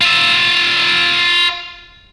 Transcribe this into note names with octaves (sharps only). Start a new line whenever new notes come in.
F4 E5